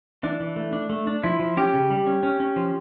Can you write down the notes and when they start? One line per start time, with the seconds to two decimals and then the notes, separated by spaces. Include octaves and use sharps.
0.23 E3 D4
0.40 E3
0.56 A3
0.73 D4
0.90 A3
1.07 D4
1.23 F3 E4
1.39 F3
1.57 C#4 G4
1.74 C#3
1.90 G3
2.07 C#4
2.23 C#4
2.40 C#4
2.56 F3